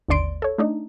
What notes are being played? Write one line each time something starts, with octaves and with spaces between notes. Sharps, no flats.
G#1 D#2 D3 D5 C6 D7
A4 C#5
A3 D4 D#4